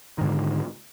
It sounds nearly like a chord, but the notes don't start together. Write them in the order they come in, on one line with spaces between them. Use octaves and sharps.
D#3 G#2 D3